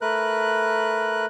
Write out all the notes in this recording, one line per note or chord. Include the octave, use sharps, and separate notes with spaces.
A3 A#4 B4 F#6